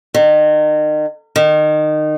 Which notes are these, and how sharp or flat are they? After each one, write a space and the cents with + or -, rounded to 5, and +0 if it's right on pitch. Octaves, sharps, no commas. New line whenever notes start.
D#3 -35
D#3 -25